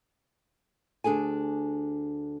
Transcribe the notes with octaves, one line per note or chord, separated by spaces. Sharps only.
D2 D4 G#4 A4 G#5